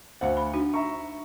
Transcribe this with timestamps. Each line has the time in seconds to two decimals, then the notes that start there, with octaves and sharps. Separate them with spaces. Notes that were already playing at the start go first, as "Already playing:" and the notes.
0.21 D2 C5 F5 F#5
0.37 B5
0.54 D4 D#4 F#4
0.74 E5 A#5 C#6